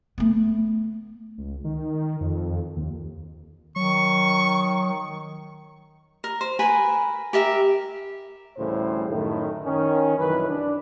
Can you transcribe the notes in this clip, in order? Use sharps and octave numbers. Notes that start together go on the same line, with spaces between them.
A3 B3
C#2
D#3
F2
D#2
D#3 F#3 C#6
A#4
C5
A#4 B4 G#5 B5
G4 A#4 E5
D2 A2 C#3 E3 G3 C5
F#2 A2 D#3
D#3 C#4
C2 F#2 E3 B4
D4